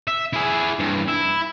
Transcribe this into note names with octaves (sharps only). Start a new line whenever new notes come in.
E5
E4 G#4
G2 E3
E4